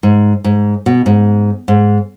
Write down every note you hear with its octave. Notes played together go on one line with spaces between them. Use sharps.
G#2
G#2
B2
G#2
G#2